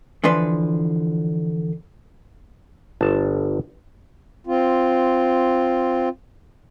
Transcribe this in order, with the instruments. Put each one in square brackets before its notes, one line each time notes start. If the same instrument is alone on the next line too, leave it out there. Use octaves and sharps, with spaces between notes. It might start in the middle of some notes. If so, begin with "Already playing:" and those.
[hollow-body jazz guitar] D3 E3 F3 D4 B4 C6
[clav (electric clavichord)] G1 A5
[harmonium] C4 F4